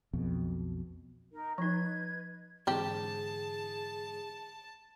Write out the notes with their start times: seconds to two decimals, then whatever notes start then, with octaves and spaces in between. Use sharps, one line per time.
0.13 B1 F2 B2
1.32 D#4 A#4
1.58 F3 D#4 B4 D#5 G#6
2.67 G#2 D3 E3 C4 G4 G#4 A5